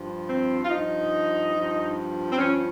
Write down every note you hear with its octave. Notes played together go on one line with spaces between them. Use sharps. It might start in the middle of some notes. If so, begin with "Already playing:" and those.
Already playing: G2 F3
C4
F4
G2 F3 D#4
F3
G2
C4
G2 F3 C#4